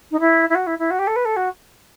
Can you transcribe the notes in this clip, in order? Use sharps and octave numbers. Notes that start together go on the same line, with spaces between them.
D#4
E4
E4
F#4
E4
E4
F#4
G4
A4
B4
A4
F#4